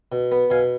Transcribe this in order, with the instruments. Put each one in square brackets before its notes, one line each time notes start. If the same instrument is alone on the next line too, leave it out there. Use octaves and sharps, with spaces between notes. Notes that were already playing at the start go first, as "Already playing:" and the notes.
[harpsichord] B2
B3
B2 F5 G#5